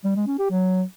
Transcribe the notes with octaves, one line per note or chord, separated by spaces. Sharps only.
G3
G#3
C#4
G4
F#3